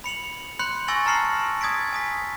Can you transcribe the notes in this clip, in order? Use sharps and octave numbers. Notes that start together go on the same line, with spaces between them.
B5 C#7 F7 F#7
B5 C6 F#6 G6 C#7 F#7
G#5 C#6 E6 A6 A#6 F#7
A5 A#5 F6 C7 C#7 F#7
D#6 G#6 A6 B6 D7
G#5 D#6 B6